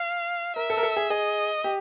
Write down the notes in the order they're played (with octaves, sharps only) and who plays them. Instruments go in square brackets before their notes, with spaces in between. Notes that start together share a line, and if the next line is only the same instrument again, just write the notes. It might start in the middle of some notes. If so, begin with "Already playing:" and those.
Already playing: [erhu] F5
[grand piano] A#4 [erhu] E5
[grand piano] A4
A#4
A4
G#4
[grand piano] G#4 [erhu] D#5
[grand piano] G4